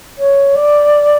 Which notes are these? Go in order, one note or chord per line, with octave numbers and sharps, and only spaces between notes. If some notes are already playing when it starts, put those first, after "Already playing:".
C#5
D5